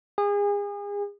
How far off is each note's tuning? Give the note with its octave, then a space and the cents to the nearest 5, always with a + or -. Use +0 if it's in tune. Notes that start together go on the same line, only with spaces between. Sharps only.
G#4 -35